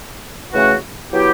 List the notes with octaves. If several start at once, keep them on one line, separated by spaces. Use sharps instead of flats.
C#3 E3 A3 C#4 F#4
F#3 B3 E4 G4